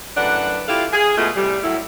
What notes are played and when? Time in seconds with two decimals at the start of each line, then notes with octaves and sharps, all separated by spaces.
0.16 F#2 A2 D4 B4 F#5
0.68 E4 F4 G4 A4 F5
0.93 G#4
1.16 B2 G#3 A3 F4 E5
1.36 A2 C3 G3
1.63 A2 F#3 E4